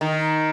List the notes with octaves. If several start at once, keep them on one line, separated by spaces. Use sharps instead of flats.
D#3